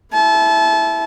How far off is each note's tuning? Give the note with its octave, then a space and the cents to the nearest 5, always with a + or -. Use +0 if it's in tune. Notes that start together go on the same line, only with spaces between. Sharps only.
E4 +0 A5 -30